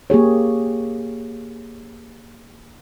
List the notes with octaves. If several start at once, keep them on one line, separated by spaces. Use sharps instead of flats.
A#3 G4 G#4 C#5